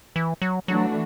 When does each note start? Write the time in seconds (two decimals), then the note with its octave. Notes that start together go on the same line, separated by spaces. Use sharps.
0.16 E3
0.42 F#3
0.68 E3 F#3 A3 D4 F#4